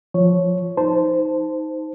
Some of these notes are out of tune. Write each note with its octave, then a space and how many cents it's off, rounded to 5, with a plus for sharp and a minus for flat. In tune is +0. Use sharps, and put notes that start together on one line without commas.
F3 +0 C#5 +0
D#4 +15 C5 -15 A5 +0